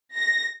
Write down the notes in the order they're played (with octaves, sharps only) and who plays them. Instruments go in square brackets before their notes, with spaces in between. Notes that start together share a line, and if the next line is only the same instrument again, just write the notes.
[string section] A#6